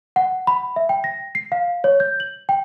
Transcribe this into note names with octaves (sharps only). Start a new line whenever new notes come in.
F#5
B5
E5
G5
A#6
C7
F5
C#5
G6
F#7
G5